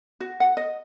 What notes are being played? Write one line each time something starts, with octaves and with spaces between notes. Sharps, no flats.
F#4
F#5
D#5